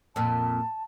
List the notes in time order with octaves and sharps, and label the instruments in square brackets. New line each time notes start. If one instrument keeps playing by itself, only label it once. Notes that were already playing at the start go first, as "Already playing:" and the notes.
[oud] F2 A#2 [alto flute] A5